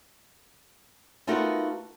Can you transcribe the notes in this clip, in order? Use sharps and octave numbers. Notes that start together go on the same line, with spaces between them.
A3 B3 D#4 F4 F#4 A#4